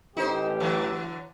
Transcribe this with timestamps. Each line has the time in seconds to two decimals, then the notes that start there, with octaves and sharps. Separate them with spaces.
0.17 A1 D#4 G4 C5
0.60 D3 E3 F#3